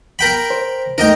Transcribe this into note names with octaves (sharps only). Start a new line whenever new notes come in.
A#4 G5 B5
C5
A3 D#4 A#4 D#5 G5